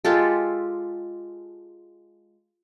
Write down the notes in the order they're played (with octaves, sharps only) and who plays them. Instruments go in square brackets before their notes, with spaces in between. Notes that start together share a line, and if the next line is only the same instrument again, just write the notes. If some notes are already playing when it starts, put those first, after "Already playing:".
[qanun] G#3 F4 G4 A4